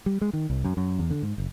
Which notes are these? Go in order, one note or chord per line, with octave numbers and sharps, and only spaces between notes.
G3
G#3
D#3
C2
F#2
F#2
E2
D3
G#2
F#1